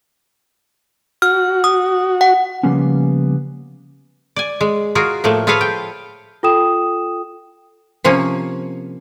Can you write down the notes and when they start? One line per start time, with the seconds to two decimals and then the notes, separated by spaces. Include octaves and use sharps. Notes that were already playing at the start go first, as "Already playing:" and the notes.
1.22 F#4 F6
1.64 D#6
2.21 F#5
2.63 C#3 F3 G3 A#3 B3 C#4
4.36 D5 G#5
4.61 G#3
4.95 F4 F#4 G#4 A#4
5.24 A2 F3 A3 A#3
5.47 F4 G#4 A4 B4 C#5 F5
5.61 G5
6.43 F4 A4 G5 D#6 E7
8.04 C3 F3 A#3 C#4